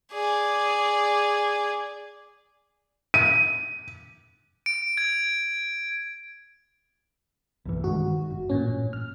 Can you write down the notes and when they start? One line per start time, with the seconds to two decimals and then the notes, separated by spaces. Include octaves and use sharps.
0.12 G#4 D5
3.14 D#7
4.66 D7
4.97 G#6
7.65 B1 G2 E3
7.84 G2 D#3 G#3 F#4
8.30 G1
8.49 A1 G2 A#2 C#4
8.93 F6